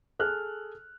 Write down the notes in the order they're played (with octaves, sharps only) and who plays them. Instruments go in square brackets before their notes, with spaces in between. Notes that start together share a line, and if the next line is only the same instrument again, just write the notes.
[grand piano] G#4 A4 F6 F#6